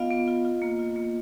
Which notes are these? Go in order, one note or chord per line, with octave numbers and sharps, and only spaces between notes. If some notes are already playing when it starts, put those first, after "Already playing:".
Already playing: B3 F4 D#5 F5
B3
F4
F4
A#3
F4
A#3